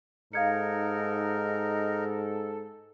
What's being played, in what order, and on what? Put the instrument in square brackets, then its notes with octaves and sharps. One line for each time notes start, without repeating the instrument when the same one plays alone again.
[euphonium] G#2 [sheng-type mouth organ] D#4 A#4 [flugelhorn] A4 [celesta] F5 G#6 C#7